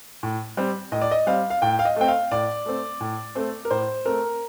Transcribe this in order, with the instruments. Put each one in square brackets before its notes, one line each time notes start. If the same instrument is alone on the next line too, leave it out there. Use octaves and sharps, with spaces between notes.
[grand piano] A2
G3 C4
A2 D#5
D5
D#5
G3 C4 F5
F5
A2 G5
F5
D#5
A3 C4 G5
F5
A2 D5
A3 C4
A2
A3 C4
A#4
A2 C5
A3 C4 A#4